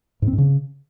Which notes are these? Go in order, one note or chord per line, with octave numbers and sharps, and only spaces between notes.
G#2
C4
G#2
C#3